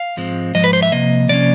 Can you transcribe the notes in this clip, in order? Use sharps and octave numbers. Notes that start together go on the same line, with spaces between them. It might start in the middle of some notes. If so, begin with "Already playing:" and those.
Already playing: F5
G#2 F3 G#3 C4
G#2 F3 D#5
B4
C5
E5
C3 F3 A#3 D#5
C3 F3 A#3 C#4 D5